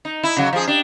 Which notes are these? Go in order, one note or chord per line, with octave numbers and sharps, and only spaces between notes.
D#4
E4
C#3 F#3
F3 G#4
D4 G4